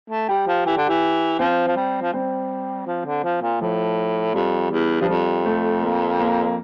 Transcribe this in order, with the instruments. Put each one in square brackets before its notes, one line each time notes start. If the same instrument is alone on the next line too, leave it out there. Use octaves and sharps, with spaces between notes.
[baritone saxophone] A3
[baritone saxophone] G3 [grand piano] G4
[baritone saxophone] F3
[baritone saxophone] E3 [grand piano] G4
[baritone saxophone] D3
[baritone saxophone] E3 [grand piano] G4
[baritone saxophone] F3 [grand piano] C4
[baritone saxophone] F3
G3
F3
[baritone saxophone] G3 [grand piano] C4
[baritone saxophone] F3
D3
F3
A#2
[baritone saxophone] A2 [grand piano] F3
[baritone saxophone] F2 [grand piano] G3
[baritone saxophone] E2
[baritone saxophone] G2 [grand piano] F3
[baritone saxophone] F2 [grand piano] G3
[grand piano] A3
A#3
A#3